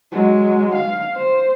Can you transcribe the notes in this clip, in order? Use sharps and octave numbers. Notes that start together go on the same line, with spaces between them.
F#3 G#3
F5
C5